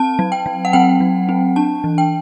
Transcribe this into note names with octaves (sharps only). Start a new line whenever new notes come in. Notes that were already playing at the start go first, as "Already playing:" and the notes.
Already playing: C4 A5
F#3
G5
F#3
F#5
C4 G5
F#3
C4
D4 A5
E3
G5